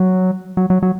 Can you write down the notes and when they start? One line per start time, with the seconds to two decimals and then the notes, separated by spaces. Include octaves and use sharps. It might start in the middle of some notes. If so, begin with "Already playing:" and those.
Already playing: F#3
0.57 F#3
0.70 F#3
0.83 F#3